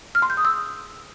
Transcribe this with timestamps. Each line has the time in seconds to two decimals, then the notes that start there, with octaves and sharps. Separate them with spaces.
0.15 F6
0.22 C6
0.30 G6
0.37 D#6
0.45 E6